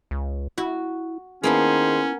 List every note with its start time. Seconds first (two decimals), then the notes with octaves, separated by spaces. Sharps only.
0.11 C#2
0.58 E4 F#4
1.43 D#3 A#3 B3 C#4 E4 G#4 A4 C5